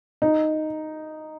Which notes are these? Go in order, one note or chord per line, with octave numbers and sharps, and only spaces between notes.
D#4